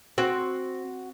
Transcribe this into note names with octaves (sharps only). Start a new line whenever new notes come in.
C4 F#4